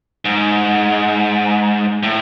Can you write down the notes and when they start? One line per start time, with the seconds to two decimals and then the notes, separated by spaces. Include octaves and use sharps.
0.25 G#2
2.03 A2